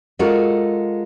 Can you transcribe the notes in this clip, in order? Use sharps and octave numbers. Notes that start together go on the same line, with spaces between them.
G#3 F4 F#4 A4 A#4